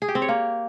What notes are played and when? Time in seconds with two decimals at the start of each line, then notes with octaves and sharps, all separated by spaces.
0.02 G#4
0.08 G4
0.15 C4
0.22 C#5
0.28 A#3